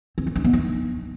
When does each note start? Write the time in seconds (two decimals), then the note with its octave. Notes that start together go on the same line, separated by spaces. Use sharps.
0.18 C4
0.27 D#3
0.36 D4
0.44 B3
0.53 D#4